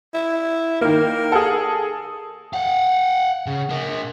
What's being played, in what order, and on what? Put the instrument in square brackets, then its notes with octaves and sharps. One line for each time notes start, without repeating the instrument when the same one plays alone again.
[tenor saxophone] E4
[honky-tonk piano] D#3 A#3 [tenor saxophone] A#4
[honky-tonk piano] G#4 A4
[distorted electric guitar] F5 F#5
C#3
D4 A#4